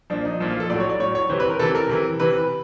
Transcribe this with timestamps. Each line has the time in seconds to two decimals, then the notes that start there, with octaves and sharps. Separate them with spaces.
0.10 A#2 F3 D4
0.25 D#4
0.40 A#2 F3
0.50 F4
0.60 A4
0.70 A2 F#3 D5
0.80 C#5
0.90 D5
1.00 A2 F#3 C#5
1.15 C#5
1.29 C3 E3 C5
1.40 B4
1.50 A#4
1.60 C3 E3 A4
1.75 A#4
1.89 C3 E3
2.20 C3 E3 B4